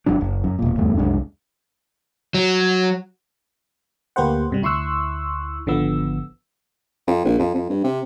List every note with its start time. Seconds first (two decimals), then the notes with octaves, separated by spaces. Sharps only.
0.06 G1 C#2 F#3 D4
0.21 F#1
0.44 F#2
0.59 E1 A#2
0.76 D1 E2 G2 A3
0.97 C2 F#2 G#3 D4
2.34 F#3
4.16 D2 A#3 G4 B4 C5 F#5
4.50 G2 C3 G3
4.62 D2 E4 C6 C#6 E6 F#6
5.66 G#1 D3 F3 B3 E6
7.08 F2
7.25 A#1
7.39 F2
7.55 F2
7.70 G2
7.84 C3